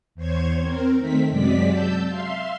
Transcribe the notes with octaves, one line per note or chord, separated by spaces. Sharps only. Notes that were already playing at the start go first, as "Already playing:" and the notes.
E2 C5 C#5 G#6
C4 A#4
D#3 A3 C4 B6
F#2 C3 F#3 G#3 D5 B6
A5 E6 G6
E5 F5 C6